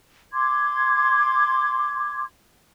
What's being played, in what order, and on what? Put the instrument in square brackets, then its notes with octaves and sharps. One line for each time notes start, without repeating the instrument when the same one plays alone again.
[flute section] C6 D6 G#6